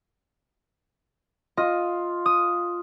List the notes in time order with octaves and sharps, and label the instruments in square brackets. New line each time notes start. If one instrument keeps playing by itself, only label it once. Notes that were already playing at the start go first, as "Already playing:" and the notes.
[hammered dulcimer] F4 [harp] D#5
[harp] D#6